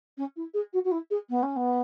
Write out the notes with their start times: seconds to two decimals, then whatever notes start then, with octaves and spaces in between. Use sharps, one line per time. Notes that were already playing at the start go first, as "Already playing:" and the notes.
0.17 C#4
0.36 E4
0.54 G#4
0.73 F#4
0.84 F#4
0.91 E4
1.10 G#4
1.29 B3
1.42 C#4
1.56 B3